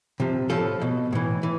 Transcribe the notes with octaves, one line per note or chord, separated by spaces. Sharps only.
C3 F3
A2 F3 A4
B2
A2 E3
E3